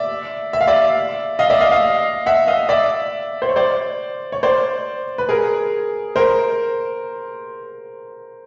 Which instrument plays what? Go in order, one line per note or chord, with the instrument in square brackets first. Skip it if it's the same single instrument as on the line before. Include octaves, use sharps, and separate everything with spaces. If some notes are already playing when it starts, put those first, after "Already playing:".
Already playing: [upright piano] D5 E5
E5
F5
D5 E5
D#5 F5
D5 E5
D#5 F5
D#5 F5
E5 F#5
D#5 F5
D5 E5
C5
C#5
C5 D5
C#5
C5 D5
B4
G#4 A#4
A#4 C5